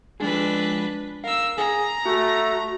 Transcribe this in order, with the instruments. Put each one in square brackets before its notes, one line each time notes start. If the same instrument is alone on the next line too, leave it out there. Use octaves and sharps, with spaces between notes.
[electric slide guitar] F3 G#3 G#4 [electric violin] D4 B4
[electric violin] A#4 E6 [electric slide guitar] F5
[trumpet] G#4 [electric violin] A#5
[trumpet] A3 [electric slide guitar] F#4